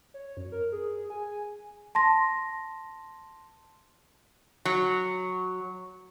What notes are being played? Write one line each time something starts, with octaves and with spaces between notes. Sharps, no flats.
C#5
F#2
A#4
G#4
G#5
A5 C6 A#6
F#3